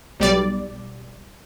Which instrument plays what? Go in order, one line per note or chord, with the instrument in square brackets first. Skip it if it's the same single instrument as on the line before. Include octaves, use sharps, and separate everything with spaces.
[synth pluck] B1 G3 D5